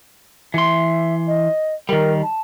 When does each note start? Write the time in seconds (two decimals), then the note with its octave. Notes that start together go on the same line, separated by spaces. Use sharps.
0.54 E3 E5 C6
1.27 D#5
1.89 D#3 G3 A#4
2.23 A5